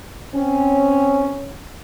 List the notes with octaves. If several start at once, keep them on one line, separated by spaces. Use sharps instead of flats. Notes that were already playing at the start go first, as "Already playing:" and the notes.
C4 C#4